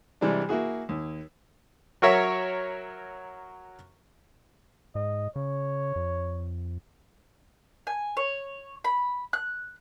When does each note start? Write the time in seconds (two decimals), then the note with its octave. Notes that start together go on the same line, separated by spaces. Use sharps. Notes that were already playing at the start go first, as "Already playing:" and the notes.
0.21 C3 E3 G3 G#3 D4
0.49 A#3 E4 F#4 G#4
0.89 D#2
2.02 F#3 F#4 A#4 C#5 E5
4.95 G#2 D#5
5.36 C#3 C#5
5.96 F2
7.87 G#5
8.17 C#5
8.84 B5
9.33 F#6